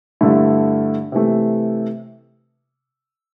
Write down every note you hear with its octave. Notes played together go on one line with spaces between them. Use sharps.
G2 D3 A3 E4
C3 E3 A3